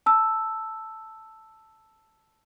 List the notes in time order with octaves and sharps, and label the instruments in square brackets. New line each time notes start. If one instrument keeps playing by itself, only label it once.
[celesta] A5 E6